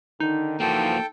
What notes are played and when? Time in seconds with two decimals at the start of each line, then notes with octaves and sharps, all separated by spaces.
0.20 D3 D#3 D#4
0.60 E3 F3 A#3 F#4 A4 G5